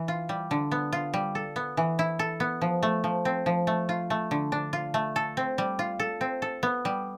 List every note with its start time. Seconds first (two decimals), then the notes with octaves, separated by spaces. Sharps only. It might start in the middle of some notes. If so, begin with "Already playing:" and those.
Already playing: E3
0.08 F4
0.29 G3
0.51 D3
0.72 B3
0.93 F4
1.14 G3
1.35 A4
1.56 B3
1.77 E3
1.99 E4
2.19 A4
2.40 B3
2.62 F3
2.83 A3
3.04 F3
3.25 C4
3.46 F3
3.67 A3
3.89 F4
4.10 A3
4.31 D3
4.52 D4
4.73 F4
4.94 A3
5.16 A4
5.37 C4
5.58 G3
5.79 F4
6.00 A4
6.21 C4
6.42 A4
6.63 B3
6.85 G3